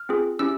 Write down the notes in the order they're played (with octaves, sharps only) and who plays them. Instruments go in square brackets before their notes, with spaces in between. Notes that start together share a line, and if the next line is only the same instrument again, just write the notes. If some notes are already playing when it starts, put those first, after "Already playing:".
Already playing: [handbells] F6
C4 F4 G#4
C#4 E4 G4 E6